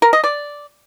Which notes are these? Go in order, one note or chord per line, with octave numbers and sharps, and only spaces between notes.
A#4
D#5
D5